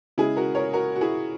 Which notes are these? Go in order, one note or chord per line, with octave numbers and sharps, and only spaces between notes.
C#3 G#3 E4 G#4
F#4 A#4
A#4 C#5
F#4 A#4
F#4
E4 G#4